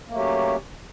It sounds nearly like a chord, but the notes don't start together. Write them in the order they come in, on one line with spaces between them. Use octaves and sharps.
A#3 A3 F#3 G4 C#4